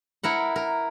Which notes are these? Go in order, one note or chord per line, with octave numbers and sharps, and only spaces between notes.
E4 A#4 F#5
A#4